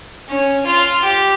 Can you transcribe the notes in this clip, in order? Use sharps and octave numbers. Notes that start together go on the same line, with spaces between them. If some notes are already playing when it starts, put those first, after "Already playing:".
C#4
F4
G4